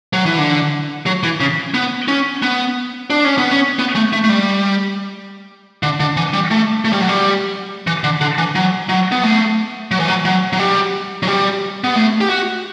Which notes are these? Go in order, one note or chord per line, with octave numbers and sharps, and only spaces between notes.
F#3
E3
D3
F#3
E3
C#3
B3
C#4
B3
D4
C#4
B3
C#4
B3
A3
A3
A3
G3
D3
D3
E3
G3
A3
A3
G3
F#3
G3
E3
D3
D3
E3
F#3
F#3
B3
A3
F#3
E3
F#3
F#3
F#3
G3
F#3
G3
B3
A3
G4
F#4